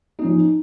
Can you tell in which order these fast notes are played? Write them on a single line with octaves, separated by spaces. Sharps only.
D#4 C#4 F3